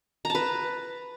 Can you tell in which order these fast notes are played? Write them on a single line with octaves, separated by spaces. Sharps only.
A#5 A5 B4